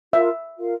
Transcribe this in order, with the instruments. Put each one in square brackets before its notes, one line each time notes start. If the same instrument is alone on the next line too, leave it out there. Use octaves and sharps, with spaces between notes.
[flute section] F4 A#4 F5 [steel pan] E5
[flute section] F4 A#4 F5